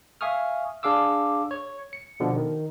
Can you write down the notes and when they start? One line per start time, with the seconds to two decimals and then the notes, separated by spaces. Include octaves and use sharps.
0.21 E5 F5 G#5 C#6 D#6 F6
0.83 D4 G#4 F5 D6 E6
1.51 C#5
1.93 C#7
2.20 B2 D3 F3
2.36 D#3